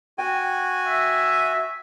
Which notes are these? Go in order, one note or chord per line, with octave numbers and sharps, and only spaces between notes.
F#4 G5 G#5
E5